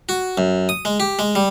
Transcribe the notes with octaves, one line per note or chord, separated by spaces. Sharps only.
F#4
F#2
D#6
G#3
G4
G#3
G3